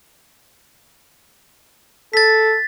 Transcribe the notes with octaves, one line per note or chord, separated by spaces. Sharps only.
A4 A6 B6